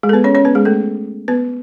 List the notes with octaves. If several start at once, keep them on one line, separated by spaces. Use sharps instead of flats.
G#3 G#4
A4
B3 B4
C#4 C#5
C#4 C#5
B3 B4
G#3 G#4
A3 A4
B3 B4